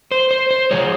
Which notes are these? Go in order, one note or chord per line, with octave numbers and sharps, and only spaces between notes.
C5
C5
C5
C#3 F3 G#3 C#5